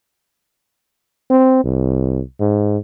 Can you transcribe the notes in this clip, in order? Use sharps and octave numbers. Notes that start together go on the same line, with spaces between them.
C4
C2
G#2